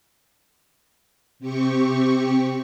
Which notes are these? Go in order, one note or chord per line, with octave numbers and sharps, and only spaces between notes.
C3 C4 G4 C#6